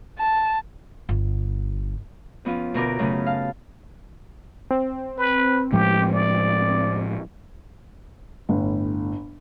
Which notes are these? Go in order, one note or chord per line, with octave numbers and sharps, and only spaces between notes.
A5
G1
F2 B3 C#4 F4
D2 B2 B3 A#4 B4 D6
F#2 C#3 A3 B3
F5 A5
C4
B4
A2 F3 G#3 G4
D5
G1 A2